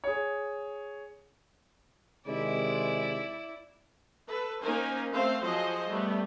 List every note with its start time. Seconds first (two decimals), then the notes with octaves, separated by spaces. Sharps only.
0.04 G#4 C#5
2.27 C3 D#3 G#3 E4 D5
4.29 A4 B4
4.62 A#3 C#4 D#4 A#4 C5 G#5
5.14 A3 C4 A4 C5 F5
5.43 F3 F#3 F#4 G#4 C5 D#5
5.88 G3 A3 B3